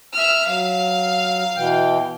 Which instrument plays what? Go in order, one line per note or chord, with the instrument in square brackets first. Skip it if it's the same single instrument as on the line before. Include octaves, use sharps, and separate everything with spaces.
[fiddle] E5 F6
[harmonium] F#3 [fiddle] F5
[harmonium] B2 E3 G5